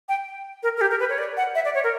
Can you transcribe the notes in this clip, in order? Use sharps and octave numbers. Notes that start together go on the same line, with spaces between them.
G5
A#4
A#4
G4
A#4
B4
C#5
D5
F#5
E5
D5
C#5
A#4